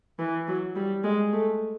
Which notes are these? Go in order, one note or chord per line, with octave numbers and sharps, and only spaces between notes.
E3
F#3
G3
G#3
A3